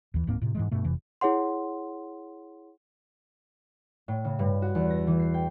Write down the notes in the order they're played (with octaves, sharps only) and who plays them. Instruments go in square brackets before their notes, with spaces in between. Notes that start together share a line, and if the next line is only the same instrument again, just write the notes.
[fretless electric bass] D#2 E3
D1 G#2 A#3 C4
A2 C3
G#2 E3 G#3
G2 B2 A3
F1 F2 C3 E3
[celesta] E4 G#4 C#5 F#5 C6
[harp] A2
C#3
G2
F#4
E2
A#6
E3
C7
G5